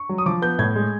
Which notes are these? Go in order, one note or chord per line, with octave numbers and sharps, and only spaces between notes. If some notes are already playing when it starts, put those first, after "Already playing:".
Already playing: C#6
F#3
D#6
F3 D6
B3 G6
A2 G#6
G#3